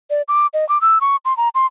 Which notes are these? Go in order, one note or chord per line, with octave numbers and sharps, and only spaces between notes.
D5
D6
D#5
D6
E6
C#6
C6
A#5
C6